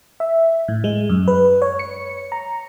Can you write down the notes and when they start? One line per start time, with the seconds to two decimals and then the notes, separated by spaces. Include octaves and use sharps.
0.20 E5
0.68 A2
0.84 G#3
1.09 F#2
1.28 B4
1.62 C#5
1.79 C#7
2.32 A#5